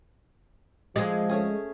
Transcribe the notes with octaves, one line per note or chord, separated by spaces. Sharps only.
F3 G#3 C4 G#4 D5
A3 C#4 G#4